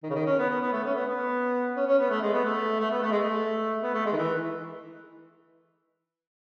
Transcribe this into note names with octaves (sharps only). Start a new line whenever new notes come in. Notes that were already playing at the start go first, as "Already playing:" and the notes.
D#3
C#3
D#3
C#4
B3
B3
B3
A3
C#4
B3
B3
C#4
C#4
B3
A3
G#3
B3
A3
A3
B3
A3
G#3
A3
B3
A3
G#3
D#3
E3